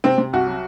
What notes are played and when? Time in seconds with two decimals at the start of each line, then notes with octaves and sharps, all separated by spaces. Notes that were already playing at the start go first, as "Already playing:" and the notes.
0.04 C3 C4
0.18 C3
0.33 C2 F#4
0.47 F#3